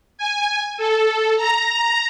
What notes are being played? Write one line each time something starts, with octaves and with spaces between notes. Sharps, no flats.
G#5
A4
A#5